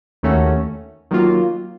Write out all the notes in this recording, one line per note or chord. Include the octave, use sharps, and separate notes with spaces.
D#2 D#3 A3 C#4 F#4
D#3 F#3 A#3 F4